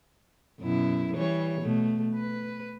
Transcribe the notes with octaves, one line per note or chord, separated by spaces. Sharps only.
F#2 B2 E4
E3 G3 C#5
B2 A3
B4